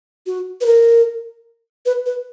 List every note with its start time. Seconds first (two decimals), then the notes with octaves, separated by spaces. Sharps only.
0.26 F#4
0.61 B4
0.66 A#4
1.86 B4
2.06 B4